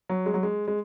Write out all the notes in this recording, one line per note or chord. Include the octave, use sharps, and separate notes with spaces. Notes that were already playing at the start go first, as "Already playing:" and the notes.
F#3
G#3
F#3
G#3
G#3